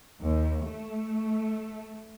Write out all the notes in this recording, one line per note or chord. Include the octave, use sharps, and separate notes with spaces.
D#2
A3